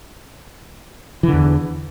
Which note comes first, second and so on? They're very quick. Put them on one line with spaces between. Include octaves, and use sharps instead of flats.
E3 D3 E2